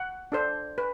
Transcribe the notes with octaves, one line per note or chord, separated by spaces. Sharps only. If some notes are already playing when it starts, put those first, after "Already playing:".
Already playing: F#5
D4 A4 C5
B4